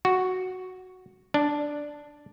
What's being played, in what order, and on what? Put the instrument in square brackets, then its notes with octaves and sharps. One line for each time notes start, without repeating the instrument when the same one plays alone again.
[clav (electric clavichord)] F#4
D4